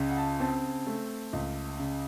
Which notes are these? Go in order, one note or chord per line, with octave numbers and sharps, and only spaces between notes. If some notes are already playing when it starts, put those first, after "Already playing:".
Already playing: C#2 C#3
F#5
A5
C4 A5
A3
C#2
C#3